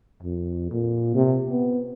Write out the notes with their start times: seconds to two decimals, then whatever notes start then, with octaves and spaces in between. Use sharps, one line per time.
0.23 F2
0.71 A#2
1.15 C3
1.51 B3